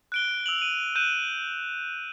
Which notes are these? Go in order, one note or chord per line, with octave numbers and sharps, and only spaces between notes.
F#6 D7 G7
E6 F7 F#7
D#7
F#6 G6 D#7 E7